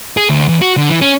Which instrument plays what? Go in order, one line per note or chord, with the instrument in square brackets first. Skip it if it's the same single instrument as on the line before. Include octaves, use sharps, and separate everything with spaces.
[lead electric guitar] G#4
D2
E2
F#4
D3
E3
C#4